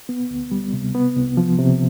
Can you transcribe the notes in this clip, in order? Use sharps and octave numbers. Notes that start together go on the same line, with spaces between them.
B3
D2
G3
C3
B3
C2
F3
C3